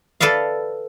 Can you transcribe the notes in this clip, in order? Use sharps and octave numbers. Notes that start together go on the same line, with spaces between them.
A4 B4 D5 E5 F5